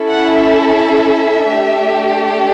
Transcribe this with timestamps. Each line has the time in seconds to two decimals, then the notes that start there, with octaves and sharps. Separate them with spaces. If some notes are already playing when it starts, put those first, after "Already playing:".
Already playing: C#4 E4 A4
0.09 F#5
0.38 E5
1.51 A3 D4 G4